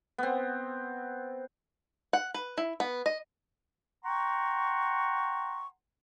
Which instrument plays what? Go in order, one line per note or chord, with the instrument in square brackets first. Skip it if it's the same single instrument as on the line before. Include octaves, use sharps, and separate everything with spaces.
[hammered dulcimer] B3 C4
[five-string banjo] F#5
B4
E4
B3
D#5
[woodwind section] F#5 G5 A#5 C6 C#6